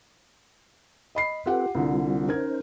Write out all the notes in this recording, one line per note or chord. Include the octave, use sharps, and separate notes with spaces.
D#5 B5 C7
C4 F4 G4 A4 B4 F#5
C2 D3 G3 C4 F4
C#4 D#4 A#4 C5 G#6